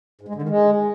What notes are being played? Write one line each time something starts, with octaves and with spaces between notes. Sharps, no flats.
G#2
G#3
D3
D#3
G#3